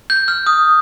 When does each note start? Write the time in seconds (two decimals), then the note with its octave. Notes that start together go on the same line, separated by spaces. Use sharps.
0.10 G6
0.28 F6
0.47 D#6